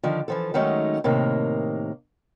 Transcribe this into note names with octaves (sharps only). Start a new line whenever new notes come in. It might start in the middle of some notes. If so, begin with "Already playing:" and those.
D3 D#3 F3 D4
E3 F3 A4
D#3 F#3 G#3 A3 C#4 D#4
A2 C3 D#3 A#3